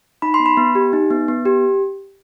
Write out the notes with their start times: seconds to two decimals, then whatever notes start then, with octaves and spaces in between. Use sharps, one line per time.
0.22 D#4 B5
0.34 C6
0.40 B3
0.46 B5
0.57 B3
0.75 G4
0.93 D#4
1.11 B3
1.28 B3
1.45 G4